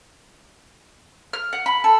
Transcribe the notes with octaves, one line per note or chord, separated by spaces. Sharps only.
F6
F#5
B5
A4